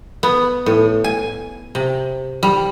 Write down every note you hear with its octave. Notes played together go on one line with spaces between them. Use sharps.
B3
A2
G#5
C3
G3